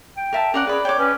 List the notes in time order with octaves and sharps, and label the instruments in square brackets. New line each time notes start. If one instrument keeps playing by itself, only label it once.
[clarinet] G5
[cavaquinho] A#4 E5 A5
[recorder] C#4 [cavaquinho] A#4 D5 F#5
[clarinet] G#4 [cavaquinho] B4 B5 [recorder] D5
[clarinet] C#5 [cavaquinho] G5 D6
[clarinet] C#4 [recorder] B4